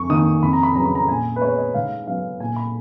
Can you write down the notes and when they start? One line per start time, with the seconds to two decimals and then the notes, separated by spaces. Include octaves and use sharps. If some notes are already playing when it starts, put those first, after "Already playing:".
Already playing: F2 C#6
0.10 D#3 A#3 D#6
0.43 F2 B5
0.53 A#5
0.63 B5
0.76 C#3 F#3 B3 A#5
0.86 B5
0.95 A#5
1.09 A#2 G#5
1.36 B4
1.42 G#3 B3 C#5
1.58 D#5
1.74 G#2 F5
2.07 F#3 B3 F5
2.40 A#2 G#5
2.56 B5